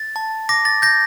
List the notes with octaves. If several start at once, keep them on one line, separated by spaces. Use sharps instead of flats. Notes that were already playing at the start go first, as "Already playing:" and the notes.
Already playing: A6
A5
D6 A#6
A6
G6 A#6